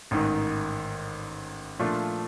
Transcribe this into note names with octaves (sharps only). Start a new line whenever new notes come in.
A1 G#2 D#3
A#2 F3 A3 D4 F4